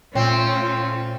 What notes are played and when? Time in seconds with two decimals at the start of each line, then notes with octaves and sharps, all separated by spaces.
0.15 A#2 A3 C4 C#4 F4